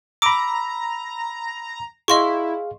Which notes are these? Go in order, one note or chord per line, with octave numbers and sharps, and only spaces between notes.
A#5 B5 D6 E6 D7
E4 G#4 D#5 F5 C6 C#6